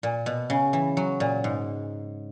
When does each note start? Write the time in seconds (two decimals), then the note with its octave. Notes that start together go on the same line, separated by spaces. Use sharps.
0.03 A#2
0.26 B2
0.50 C#3
0.73 E3
0.97 F#3
1.20 A#2
1.44 G#2